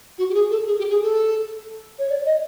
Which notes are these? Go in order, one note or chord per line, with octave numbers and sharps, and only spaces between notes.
F#4
G4
G#4
A4
G#4
G4
G#4
A4
C#5
D5
D#5